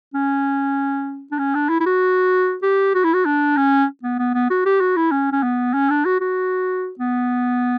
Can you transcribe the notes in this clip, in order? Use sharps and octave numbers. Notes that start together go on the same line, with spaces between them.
C#4
D4
C#4
D4
E4
E4
F#4
G4
F#4
E4
F#4
D4
C#4
B3
B3
B3
F#4
G4
F#4
E4
C#4
C#4
B3
C#4
D4
F#4
F#4
B3